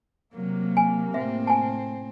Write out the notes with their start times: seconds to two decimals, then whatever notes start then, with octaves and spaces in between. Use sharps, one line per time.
0.34 C3 F#3 A#3
0.77 G#5
1.14 A2 C4 E5
1.47 G#5 A5